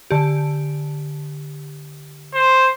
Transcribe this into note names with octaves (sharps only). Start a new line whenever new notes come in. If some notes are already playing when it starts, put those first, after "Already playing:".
D3 G4
C5